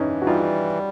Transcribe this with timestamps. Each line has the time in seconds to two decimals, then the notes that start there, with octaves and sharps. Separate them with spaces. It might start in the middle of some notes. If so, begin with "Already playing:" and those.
Already playing: G2 E3 C#4 D#4
0.22 F#4
0.27 G3 D#4 F4